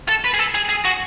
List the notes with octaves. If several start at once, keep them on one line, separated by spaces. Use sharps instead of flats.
A4
B4
G#4
A4
G#4
G#4
F#4